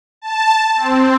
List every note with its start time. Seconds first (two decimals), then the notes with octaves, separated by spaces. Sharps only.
0.22 A5
0.76 C4